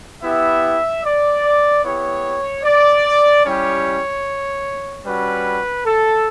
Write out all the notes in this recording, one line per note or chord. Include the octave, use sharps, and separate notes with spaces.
B3 E4 G4 E5
D5
B3 E4 G4 C#5
D5
G3 C#4 E4 G4 C#5
G3 C#4 F#4 B4
A4